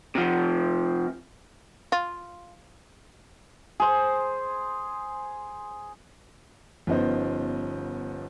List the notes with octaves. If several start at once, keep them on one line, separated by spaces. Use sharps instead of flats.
C3 F3
F4
G#4 C5
G1 F3 B3 C#4 D#4 C5